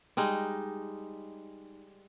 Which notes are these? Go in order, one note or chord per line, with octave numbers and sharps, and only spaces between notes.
G3 G#3 D#4